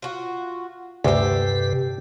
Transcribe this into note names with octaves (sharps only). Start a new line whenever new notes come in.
F4 F#4
D2 G2 C3 G4 A4 B4